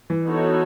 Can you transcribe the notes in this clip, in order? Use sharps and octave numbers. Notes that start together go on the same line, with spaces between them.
E3
B3 D#4 F#4 A4 C#5